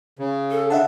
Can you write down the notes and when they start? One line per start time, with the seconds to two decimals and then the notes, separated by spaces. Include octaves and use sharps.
0.19 C#3
0.51 A4
0.70 D4 E5 F#5 A5